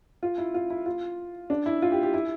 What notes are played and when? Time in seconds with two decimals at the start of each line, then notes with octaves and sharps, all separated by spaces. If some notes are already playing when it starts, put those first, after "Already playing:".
0.23 F4
0.38 E4
0.54 F4
0.70 E4
0.86 F4
1.50 D4
1.66 E4
1.82 F4
1.92 G4
2.03 G4
2.14 E4